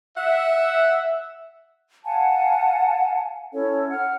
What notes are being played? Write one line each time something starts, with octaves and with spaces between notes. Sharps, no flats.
E5 F#5
F5 F#5 G#5 A5
C#4 E4 A4 C#5
F#5 F6